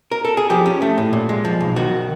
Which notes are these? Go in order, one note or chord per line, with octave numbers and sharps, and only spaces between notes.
A#4
A4
G#4
F3 G4
C#4
A3
A2
A#2
G#3
F3
B1
D#3 F#4